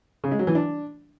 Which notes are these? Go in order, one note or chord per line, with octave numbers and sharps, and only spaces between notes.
C#3
G#3
F#3
E3
D4